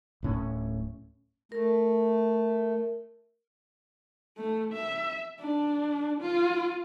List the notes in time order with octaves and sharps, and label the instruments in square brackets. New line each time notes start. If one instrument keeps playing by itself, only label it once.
[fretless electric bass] D1 A2 C#4
[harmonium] A3 [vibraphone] A#4
[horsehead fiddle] A3
E5
D4
F4